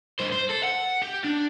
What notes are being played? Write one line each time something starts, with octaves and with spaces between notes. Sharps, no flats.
G2 C5
C5
A4
F#5
G4
D4